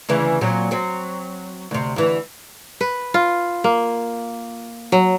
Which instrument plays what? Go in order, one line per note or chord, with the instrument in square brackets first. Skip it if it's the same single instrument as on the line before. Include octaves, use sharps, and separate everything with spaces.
[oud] D2 C#3 E3
A#2 F#3 C4
F#3 C4
D2 C3
D2 E3
[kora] B4
F4
A#3
F#3